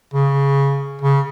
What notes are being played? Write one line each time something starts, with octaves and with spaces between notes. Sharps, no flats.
C#3
C#3